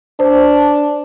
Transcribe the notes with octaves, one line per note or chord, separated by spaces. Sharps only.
D4 C5